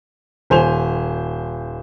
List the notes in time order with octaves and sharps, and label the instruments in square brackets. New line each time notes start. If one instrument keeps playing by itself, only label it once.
[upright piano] D#1 C5 G#5 F7